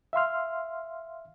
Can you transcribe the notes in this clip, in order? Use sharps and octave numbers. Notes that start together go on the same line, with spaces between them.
E5 F5 C6 F6